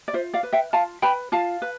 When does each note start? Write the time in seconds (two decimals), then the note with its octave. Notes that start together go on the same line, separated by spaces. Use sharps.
0.08 D5
0.13 F4 C5 E5
0.33 D5 F5
0.43 B4
0.52 E5 G5
0.73 F4 F5 A5
1.02 B4 G5 B5
1.32 F4 F5 A5
1.62 B4